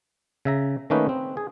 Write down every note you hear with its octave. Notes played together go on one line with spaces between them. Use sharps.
C#3 E5 A#5
D#3 A3 A#3 C#4 D#4 B4
C4
G#4